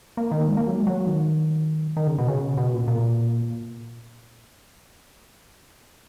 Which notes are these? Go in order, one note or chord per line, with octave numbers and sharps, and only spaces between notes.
A#3
D#3
G#3
A#3
F#3
G#3
F#3
D#3
D#3
C#3
B2
C#3
B2
A#2
A#2